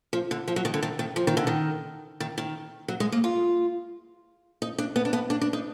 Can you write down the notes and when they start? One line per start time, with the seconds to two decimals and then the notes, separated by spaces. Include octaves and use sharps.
0.13 F3
0.31 D3
0.48 F3
0.56 F#3
0.65 D#3
0.74 D3
0.83 D#3
0.99 D#3
1.16 F3
1.27 D#3
1.37 D3
1.47 D#3
2.20 D#3
2.38 D#3
2.88 F#3
3.00 G#3
3.12 A#3
3.24 F4
4.62 D#4
4.78 D4
4.96 B3
5.05 D4
5.13 B3
5.30 D4
5.41 D4
5.53 D#4